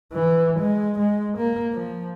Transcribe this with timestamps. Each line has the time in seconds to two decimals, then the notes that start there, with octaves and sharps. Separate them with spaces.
0.13 E3
0.59 G#3
0.99 G#3
1.37 A#3
1.74 F3